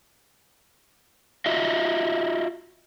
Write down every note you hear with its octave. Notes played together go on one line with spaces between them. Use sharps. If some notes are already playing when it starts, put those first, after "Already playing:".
F4 F#4 D#5 E5